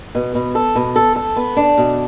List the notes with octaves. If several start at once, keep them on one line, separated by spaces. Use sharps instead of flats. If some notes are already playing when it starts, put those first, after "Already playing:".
B2
B2
A4
B2
A4
A4
B3
D4
B2